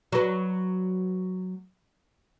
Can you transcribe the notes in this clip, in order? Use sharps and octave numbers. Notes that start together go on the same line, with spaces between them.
F#3 B4